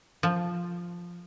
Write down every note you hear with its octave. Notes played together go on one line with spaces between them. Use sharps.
F3